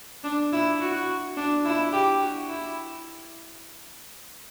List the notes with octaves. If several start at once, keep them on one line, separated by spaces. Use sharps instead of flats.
D4
E4
F#4
D4
E4
G4
F#4
E4